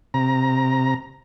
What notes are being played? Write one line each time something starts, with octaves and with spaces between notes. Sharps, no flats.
C3 A#5